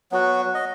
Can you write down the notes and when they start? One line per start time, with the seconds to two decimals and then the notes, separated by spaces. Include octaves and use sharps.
0.12 F#3 B3 F#4
0.54 D#5